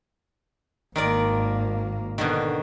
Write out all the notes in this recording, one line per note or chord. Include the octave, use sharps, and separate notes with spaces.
G#1 D#3 A#3 A#4 D5
B2 D3 D#3